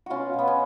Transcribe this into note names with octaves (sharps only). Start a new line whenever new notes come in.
B2 C#4 F4 F#4
B2
B3
C#4